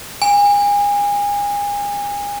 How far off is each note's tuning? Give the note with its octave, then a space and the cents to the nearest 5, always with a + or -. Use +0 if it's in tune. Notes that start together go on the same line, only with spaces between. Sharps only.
G#5 -30